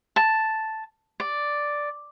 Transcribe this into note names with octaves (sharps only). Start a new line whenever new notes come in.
A5
D5